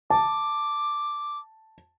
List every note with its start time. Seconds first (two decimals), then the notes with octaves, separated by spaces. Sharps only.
0.10 A5 D6